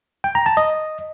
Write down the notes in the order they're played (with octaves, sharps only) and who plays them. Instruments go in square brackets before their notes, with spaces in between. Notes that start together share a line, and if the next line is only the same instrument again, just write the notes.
[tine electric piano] G5
A#5
A5
D#5